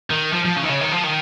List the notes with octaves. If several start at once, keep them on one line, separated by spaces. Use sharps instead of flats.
D#3
F3
F3
C#3
D#3
C#3
D#3
F3
D#3